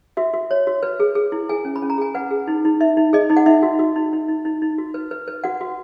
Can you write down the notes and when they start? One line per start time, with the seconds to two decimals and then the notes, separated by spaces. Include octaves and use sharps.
0.17 F#4 E5
0.34 F#4
0.51 C#5
0.67 F#4
0.83 B4
1.00 G#4
1.15 G#4
1.32 E4
1.49 G#4 G#5
1.65 C#4
1.76 B5
1.82 C#4
1.90 A#5
1.98 G#4 G#5
2.15 B4 F#5
2.31 G#4
2.48 D#4
2.65 D#4
2.80 D#4 E5
2.97 D#4
3.13 G#4 D#5
3.30 D#4
3.37 F#5
3.46 D#4 E5
3.63 F#4
3.79 F#4
3.96 D#4
4.13 D#4
4.29 D#4
4.45 D#4
4.62 D#4
4.78 F#4
4.94 B4
5.11 B4
5.28 B4
5.44 F#4 F#5
5.61 F#4